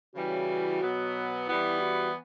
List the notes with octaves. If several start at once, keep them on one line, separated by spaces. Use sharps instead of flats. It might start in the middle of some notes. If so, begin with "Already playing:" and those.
C#3 E3 G3 F#4
B2 F#3 B3
E3 G3 B3 E4
F#4